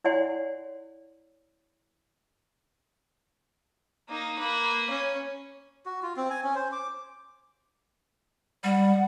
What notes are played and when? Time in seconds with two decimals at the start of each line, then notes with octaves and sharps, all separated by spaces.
0.04 E4 C#5 D5 F#5 G#5 C6
4.09 A#3 D#4
4.39 A#3 B4
4.90 C#4
5.86 F#4
6.02 F4
6.17 C4
6.30 G#5
6.43 C#4
6.55 C5
6.72 D6
8.64 G3 F#5